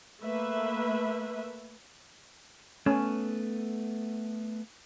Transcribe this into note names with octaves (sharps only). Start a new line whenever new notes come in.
A3 A#3 B4 E5
A3 B3 C#4